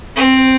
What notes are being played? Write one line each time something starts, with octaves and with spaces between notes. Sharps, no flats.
C4